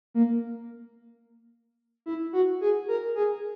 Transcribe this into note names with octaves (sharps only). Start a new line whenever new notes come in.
A#3
E4
F#4
G#4
A#4
G#4